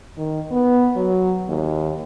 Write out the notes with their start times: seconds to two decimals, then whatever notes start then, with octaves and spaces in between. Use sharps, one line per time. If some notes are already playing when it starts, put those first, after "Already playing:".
0.17 D#3
0.51 B3
0.96 F#3
1.48 D#2